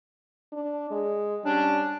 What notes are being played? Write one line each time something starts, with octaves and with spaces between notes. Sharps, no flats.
D4
G#3
G3 C#4 D4